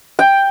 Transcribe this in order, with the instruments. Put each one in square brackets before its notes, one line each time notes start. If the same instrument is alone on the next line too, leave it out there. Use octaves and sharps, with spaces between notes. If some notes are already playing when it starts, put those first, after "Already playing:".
[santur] G5